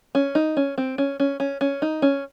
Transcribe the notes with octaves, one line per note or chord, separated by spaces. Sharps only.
C#4
D#4
C#4
C4
C#4
C#4
C#4
C#4
D#4
C#4